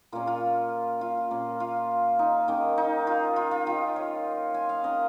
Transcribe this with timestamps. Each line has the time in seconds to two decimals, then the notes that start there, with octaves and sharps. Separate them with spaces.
0.12 A#2 A#3 C#4 F4
0.27 F4
1.01 F4
1.31 A#2 A#3 C#4
1.60 F4
2.19 D#4
2.48 D#3 A#3 C#4
2.78 D#4
3.07 F4
3.36 F4
3.51 F4
3.67 D#3 C#4 F4
3.96 C#5
4.54 G#5
4.69 F5
4.83 D#3 C#4 D#5